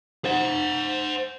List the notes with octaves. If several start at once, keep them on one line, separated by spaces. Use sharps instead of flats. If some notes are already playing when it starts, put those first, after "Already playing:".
C5 F#5